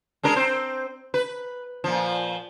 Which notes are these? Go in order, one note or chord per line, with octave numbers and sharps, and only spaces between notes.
G#3 D4 A#4
C4 C5
B4
A#2 F3